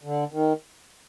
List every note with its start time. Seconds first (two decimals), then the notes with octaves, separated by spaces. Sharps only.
0.04 D3
0.32 D#3